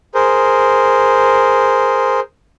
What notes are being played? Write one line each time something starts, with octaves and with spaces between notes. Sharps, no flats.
G#4 A#4 C5